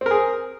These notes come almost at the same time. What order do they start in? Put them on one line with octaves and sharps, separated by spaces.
C4 A#4 G#4